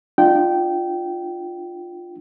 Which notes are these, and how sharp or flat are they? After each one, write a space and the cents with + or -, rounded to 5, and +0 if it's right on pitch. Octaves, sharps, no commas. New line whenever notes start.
D4 +40 F4 +5 G5 -15